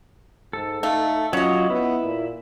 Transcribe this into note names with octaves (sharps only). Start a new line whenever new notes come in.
G#2 A4
A3 D#4 F5
F#3 C#4 F4 C#5 D#5
B3 E4
A#2